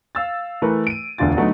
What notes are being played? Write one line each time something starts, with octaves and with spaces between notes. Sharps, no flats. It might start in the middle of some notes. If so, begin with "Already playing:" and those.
F5 E6 A6
E3 A3 A#4 B4
D7 D#7
E1 D2 D4 F4 A6
D3 F#3 A3 B3 D#4